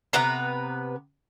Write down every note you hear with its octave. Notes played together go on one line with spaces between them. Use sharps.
C3 B3 B4 A#5